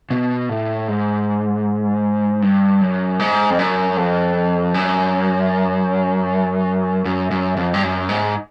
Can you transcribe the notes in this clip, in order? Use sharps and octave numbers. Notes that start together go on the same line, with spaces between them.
B2
A2
G#2
G2
F#2
G#2
F2
F#2
F2
F#2
F#2
F#2
F2
G2
F#2
G#2